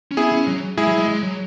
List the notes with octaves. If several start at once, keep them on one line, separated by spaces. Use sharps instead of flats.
C#4
B3 E4 G#4
C#4
F#3
G#3 E4 G#4
F#3
G#3
G#3
F#3